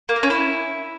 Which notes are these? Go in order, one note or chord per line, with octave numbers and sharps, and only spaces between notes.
A#3
A#4
C#4
E4